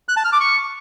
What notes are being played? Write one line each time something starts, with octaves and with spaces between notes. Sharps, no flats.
F#6
A5
F6
D6
C#6